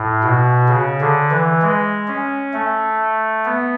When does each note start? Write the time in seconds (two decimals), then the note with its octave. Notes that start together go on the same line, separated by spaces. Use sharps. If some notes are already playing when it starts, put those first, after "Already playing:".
Already playing: A2
0.24 B2
0.69 C#3
1.01 D3
1.31 E3
1.62 G#3
2.08 C#4
2.54 A3
3.45 B3